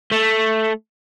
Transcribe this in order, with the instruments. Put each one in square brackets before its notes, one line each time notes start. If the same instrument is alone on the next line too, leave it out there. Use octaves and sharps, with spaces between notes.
[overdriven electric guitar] A3